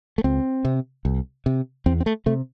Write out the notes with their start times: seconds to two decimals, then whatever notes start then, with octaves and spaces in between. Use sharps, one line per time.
0.18 A3
0.24 C#2 C4
0.65 C3
1.05 C2
1.46 C3
1.86 E2 C4
2.01 C4
2.06 A3
2.26 C3 A3